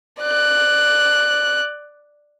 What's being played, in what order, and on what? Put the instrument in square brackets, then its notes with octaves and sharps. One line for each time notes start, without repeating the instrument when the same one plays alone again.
[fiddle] D5 F#6